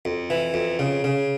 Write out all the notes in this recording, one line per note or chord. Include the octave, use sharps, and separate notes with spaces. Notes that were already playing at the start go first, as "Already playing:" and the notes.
F2
E3
F2
C#3
C#3